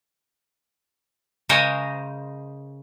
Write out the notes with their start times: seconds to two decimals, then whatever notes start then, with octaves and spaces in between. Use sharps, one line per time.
1.49 C#3 G#3 A#4 C5 C#5 D#5